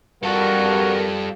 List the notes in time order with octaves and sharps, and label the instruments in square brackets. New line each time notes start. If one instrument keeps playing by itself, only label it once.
[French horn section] G2 A#4 [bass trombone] G3 [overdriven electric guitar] F4 A4 [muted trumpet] F#4